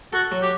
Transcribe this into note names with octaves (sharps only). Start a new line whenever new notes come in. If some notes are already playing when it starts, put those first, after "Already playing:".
F#4 A4
F#3
G4